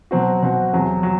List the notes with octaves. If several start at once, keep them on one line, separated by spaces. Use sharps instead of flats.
B2 F#3 C4 F#4
B2 F#3 C4 F#4
E2 C3 F#3
F#3